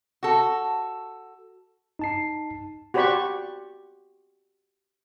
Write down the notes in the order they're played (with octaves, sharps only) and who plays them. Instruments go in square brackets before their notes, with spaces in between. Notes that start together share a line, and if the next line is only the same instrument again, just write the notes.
[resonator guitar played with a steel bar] F#4 A4
[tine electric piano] D#4 A5 C7
[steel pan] F#4 G4 C5 D5 B5 C#6